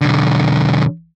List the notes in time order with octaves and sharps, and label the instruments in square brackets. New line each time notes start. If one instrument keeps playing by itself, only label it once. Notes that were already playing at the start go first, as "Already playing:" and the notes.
[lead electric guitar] B1 D3